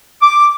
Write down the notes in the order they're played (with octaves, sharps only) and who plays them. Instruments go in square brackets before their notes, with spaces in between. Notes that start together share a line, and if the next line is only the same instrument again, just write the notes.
[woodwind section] D6